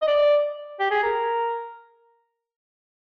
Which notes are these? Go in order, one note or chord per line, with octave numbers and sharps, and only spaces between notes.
D#5
D5
G4
G#4
A#4